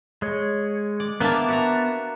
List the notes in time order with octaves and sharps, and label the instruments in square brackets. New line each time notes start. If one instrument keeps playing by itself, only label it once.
[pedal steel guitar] G#3 C#5
[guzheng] D5
[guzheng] A#3 D4 E5 [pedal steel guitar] B3 A5
[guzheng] F#4 E5 A#5